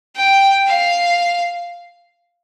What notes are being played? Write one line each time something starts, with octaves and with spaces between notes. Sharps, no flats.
G5
F5